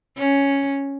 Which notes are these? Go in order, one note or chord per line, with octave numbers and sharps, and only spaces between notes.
C#4